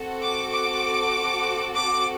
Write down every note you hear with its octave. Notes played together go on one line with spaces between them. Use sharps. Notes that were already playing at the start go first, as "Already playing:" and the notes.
Already playing: C4 F#4 A4
D6
D6
D6